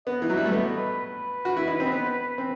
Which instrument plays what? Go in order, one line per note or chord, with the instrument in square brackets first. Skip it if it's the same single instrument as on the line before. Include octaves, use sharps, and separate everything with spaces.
[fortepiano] B3 [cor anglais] D#5
[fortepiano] E3
[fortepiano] F#3 [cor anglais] E5
[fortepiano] G3
A3
[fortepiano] B3 [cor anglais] D#5
[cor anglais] B4
B4
[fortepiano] F#4
E4
D#4
C4
B3
C4